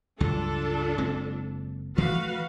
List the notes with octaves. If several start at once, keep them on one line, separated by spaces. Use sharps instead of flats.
C#2 G2 F#3 D4 F4 A4
F#1 G#3 C4
E3 F3 A3 F#4 B4 F5